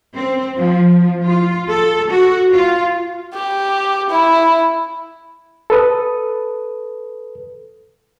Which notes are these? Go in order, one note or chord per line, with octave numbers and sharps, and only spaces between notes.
C4
F3
F4
A4
F#4
F4
G4
E4
A4 B4 D#6